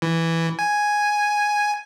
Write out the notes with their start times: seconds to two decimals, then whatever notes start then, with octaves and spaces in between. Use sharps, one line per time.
0.02 E3
0.59 G#5